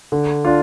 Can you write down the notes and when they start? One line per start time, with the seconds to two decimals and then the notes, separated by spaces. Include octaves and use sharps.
0.12 D3
0.45 D4 F4